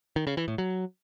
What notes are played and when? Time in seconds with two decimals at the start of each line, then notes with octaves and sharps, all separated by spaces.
0.16 D#3
0.27 C#3
0.37 E3
0.48 A2
0.58 F#3